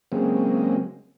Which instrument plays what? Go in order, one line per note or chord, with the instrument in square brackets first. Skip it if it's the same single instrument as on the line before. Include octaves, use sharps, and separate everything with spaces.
[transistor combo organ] C#3 F#3 G#3 A#3 C4